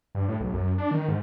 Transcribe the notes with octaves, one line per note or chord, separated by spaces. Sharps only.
G2
A2
B1
F#2
D4
D#3
G#2